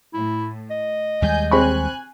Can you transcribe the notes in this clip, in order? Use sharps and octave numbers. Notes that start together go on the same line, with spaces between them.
A2 E4
D#5
D#2 G3 G#3 G#5 G6
C4 G#5 B5 C#6 F#6